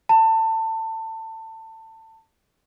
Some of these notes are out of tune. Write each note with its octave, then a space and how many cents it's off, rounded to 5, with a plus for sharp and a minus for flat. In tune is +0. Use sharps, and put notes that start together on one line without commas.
A5 +25